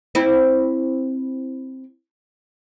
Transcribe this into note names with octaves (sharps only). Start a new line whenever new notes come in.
C4 E4